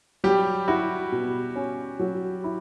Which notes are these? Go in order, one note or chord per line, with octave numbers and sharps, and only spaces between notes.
F#3 G3 G4
E4 F#4
B2
C#4
F#3
E4